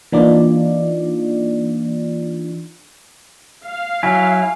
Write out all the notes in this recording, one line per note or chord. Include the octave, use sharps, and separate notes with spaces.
E3 A#3 D4 D#4 F4 D5
F5
F#3 E4 G#5